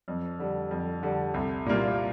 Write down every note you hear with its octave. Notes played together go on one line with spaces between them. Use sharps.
F2
D3 G3
F2
D3 G3
C2
A#2 G3 A#3 F4